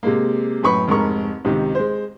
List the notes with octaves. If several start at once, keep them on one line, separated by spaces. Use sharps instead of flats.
C3 G#3 A#3
F#2 A2 B4 B5 C#6
F1 G#2 A#4 C#6
C#2 C3 D#3
G#3 C5